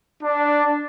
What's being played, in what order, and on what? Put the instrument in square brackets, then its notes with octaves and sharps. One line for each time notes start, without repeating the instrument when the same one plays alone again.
[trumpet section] D4